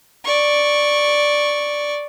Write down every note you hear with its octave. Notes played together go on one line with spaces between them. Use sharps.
D5 C#6